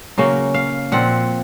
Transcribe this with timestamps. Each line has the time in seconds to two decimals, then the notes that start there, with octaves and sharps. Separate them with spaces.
0.18 C#3 F#3 A#3 C#4
0.54 F5
0.92 A#2 F3 C4 F#5